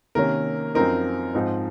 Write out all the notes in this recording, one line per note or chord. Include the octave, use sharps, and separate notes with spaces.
C3 D#3 A#3 C#4 A#4
F#2 F3 C4 D#4 A#4
G#2 F3 C4 D#4